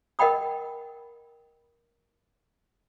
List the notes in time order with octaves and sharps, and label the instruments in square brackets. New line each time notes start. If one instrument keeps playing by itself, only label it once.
[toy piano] A#4 D#5 F#5 G5 B5 D#6